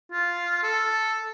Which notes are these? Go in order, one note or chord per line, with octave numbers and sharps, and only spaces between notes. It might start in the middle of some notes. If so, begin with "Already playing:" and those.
F4
A4